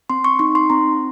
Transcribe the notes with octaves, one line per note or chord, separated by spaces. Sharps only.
C4 C6
C#6
D#4 C#6
C6
C4 A#5